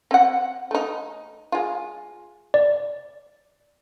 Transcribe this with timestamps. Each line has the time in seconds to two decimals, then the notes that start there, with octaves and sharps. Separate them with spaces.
0.11 C4 F#5
0.71 A3 D#4
1.52 G#3 F4
2.54 D5